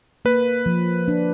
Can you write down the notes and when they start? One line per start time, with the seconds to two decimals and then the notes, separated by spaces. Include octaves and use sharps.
0.25 A#3 B4
0.66 F3
1.08 D4